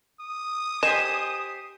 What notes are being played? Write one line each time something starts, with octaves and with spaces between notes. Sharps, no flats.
D#6
G4 C5 D#5 G#5 E7